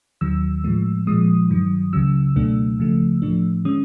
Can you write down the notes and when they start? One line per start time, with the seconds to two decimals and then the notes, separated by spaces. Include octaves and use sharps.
0.21 D#2 D#3 F#3 E6
0.64 A2 F3 G#3
1.07 A#2 F3 G#3 D#6
1.50 G2 D#3 F#3
1.93 C#2 C#3 F#3 E6
2.36 C#2 B2 F#3 A3 D4
2.79 C#2 C#3 F3 A3
3.22 A2 F3 A3 D4
3.65 D#3 G#3 C#4 D#6